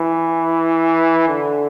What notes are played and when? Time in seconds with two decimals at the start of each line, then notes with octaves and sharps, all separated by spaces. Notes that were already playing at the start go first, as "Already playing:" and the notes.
Already playing: E3
1.29 D3